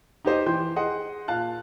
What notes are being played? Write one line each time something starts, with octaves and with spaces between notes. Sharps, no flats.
D#4 G4 C5 D#5
E3 G5 C6 G6
G#4 D#5 F#5 C6
A#2 F5 A5 F#6